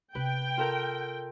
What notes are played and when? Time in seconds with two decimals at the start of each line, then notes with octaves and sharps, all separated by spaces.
0.15 C3 C#4 B4 G5
0.57 F4 A4 A#4